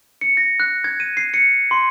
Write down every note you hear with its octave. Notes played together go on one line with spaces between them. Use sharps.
C#7
A#6
F#6
G#6
D#7
C7
C#7
C6